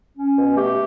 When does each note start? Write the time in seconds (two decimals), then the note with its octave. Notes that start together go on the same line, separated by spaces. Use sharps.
0.16 C#4
0.36 B2
0.56 A3 G4